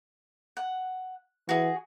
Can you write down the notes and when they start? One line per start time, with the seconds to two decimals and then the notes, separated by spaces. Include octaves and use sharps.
0.57 F#5
1.49 E3 F#4 G#4